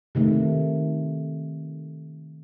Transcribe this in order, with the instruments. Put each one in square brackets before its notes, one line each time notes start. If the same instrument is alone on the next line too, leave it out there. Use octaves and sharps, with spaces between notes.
[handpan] C3 D#3 A3